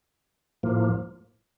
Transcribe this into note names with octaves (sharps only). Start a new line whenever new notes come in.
A2 F3 A#3